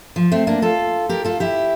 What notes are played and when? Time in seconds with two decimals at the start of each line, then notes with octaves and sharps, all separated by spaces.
0.16 F3
0.32 A3 C4
0.47 A#3 D4
0.62 F4 A4
1.09 G4 A#4
1.25 F4 A4
1.40 E4 G4